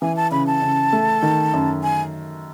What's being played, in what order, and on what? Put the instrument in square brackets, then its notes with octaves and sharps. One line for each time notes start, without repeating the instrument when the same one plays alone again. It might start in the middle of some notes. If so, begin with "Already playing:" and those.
[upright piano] E3 [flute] G#5
[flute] A5
[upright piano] C#3 [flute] B5
[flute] A5
[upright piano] C#3
A3
D#3
F#2
[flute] G#5